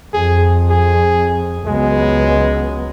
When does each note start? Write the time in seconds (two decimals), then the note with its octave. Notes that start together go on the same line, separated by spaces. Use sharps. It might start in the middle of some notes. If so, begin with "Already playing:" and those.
0.13 F2 G#4
0.70 G#4
1.66 C#2 F#3 G#3 B3